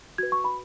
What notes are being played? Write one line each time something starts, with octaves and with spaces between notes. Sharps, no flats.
F#4 B4 G#6
C#6
B5